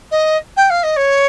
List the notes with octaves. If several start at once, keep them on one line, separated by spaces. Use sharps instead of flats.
D#5
G5
F5
D#5
C#5